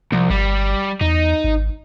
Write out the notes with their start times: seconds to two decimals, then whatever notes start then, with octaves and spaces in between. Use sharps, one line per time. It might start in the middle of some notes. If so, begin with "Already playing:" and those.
0.12 C2 F3
0.30 G1 G3
1.01 E2 D#4
1.44 G#1